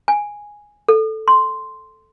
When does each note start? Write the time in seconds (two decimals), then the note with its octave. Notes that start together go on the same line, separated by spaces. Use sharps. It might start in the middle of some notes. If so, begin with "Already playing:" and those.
0.08 G#5
0.88 A4
1.28 C6